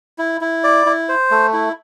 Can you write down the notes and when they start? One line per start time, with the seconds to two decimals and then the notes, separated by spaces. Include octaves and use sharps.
0.18 E4
0.41 E4
0.64 D5
0.86 E4
1.09 C5
1.31 A3
1.53 E4